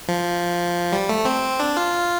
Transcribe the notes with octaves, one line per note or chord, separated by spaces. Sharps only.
F3
G3
A3
C4
D4
F4